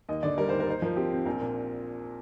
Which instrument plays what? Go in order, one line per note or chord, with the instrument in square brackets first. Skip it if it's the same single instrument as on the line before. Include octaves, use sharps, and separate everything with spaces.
[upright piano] D#2 D#5
D3 D5
G3 A#4
D#2 C5
A#4
D#4 C5
F3 A#4
C4 G4
C4
A#1 A#4
A#2